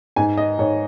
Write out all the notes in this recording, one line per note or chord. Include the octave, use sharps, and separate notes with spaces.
G#2 G#5
D#5
G#2 C#5